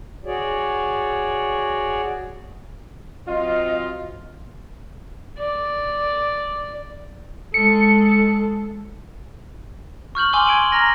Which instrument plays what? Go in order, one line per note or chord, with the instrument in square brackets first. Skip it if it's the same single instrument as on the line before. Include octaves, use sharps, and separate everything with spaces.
[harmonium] F#4 G#4 C#5 D5
[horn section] F#3 C4 F4 [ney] D#5
[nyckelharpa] D5
[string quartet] G#3 [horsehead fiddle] A4 [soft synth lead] C#7
[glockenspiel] C#6 F6 G6 F#7
G#5 C6 D6 E6 F6 G7
G#6 D7 D#7 F#7
A#5 F6 A#6